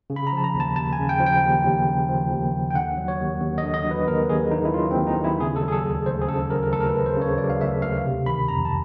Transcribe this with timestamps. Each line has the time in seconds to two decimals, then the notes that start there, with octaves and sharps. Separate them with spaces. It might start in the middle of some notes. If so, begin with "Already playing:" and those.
0.10 C#3
0.16 B5
0.27 A#5
0.32 F3 A5
0.44 A#5
0.55 D#2
0.60 A5
0.76 D#2 A5
0.93 G#5
0.99 C#3
1.09 G5
1.20 F3
1.26 G5
1.43 D#2
1.64 D#2
1.87 C#3
2.08 F3
2.30 D#2
2.53 D#2
2.71 G5
2.74 D3 F#5
2.97 F#3
3.08 C#5
3.19 D#2
3.41 D#2
3.58 D3 D#5
3.74 D#5
3.85 F#3
3.91 B4
4.07 D#2 A#4
4.29 D#2 G#4
4.51 D3 D#4
4.65 E4
4.74 F#3 F4
4.91 D#2 C4
5.07 D#4
5.17 D#2
5.24 E4
5.40 C#3 G#4
5.56 A4
5.62 F#3
5.68 G#4
5.72 A4
5.84 D2
6.06 D2 C5
6.22 G#4
6.28 C#3 A4
6.50 F#3 A#4
6.63 A#4
6.72 D2 A4
6.80 A#4
6.89 B4
6.95 D2
7.06 C5
7.17 C#3 C#5
7.38 F#3 D5
7.50 F5
7.61 D2 E5
7.82 D2 F5
8.05 C3
8.26 D#3 B5
8.48 F2 A#5
8.65 A5